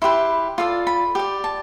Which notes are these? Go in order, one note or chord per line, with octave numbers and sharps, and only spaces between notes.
E4 G4 B4 C6
F4 A4 D5
B5
G4 D5
A5